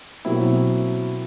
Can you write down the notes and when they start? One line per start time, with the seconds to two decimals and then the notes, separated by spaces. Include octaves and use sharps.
0.25 B2 F#3 A#3 C4 E4